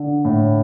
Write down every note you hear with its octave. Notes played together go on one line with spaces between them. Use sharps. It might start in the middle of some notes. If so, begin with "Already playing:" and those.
Already playing: D3
A2